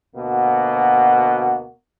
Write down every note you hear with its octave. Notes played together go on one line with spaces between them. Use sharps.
D2 B2 A#3 F#4